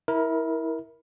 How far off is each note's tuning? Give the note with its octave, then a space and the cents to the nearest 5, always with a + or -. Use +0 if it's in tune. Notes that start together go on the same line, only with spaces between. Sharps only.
E4 -20 A#4 +10